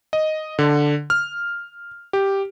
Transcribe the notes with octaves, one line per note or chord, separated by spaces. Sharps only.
D#5
D3
F6
G4